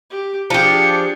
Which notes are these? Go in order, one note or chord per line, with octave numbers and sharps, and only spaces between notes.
G4
F3 D4 G4 G#4 C#7